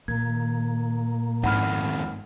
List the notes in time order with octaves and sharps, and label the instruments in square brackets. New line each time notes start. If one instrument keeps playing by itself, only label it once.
[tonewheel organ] A#2 A#3 [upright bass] D#3 [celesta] G#6
[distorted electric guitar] F2 D#3 [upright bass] G#2 [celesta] F#5 B5 F6